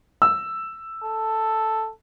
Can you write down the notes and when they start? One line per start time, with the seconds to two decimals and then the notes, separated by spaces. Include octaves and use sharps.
0.22 E6
1.04 A4